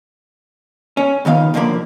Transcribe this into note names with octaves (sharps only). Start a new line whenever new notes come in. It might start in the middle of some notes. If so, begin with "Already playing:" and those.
C#4
C#2 D#3 B3 F5
B1 F2 D3 F3 A#3 B5